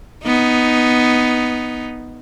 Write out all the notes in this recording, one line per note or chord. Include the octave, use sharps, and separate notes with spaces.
B3 D#4